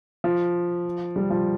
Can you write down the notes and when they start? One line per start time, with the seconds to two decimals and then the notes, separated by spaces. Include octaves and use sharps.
0.24 F3
1.16 G3
1.30 F3